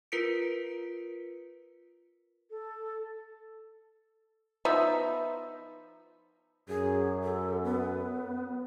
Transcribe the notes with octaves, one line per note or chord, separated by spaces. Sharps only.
F4 A#4 B4 B6 C#7 D7
A4
F3 B3 D#4 E5
F#2 G#4
A4
B3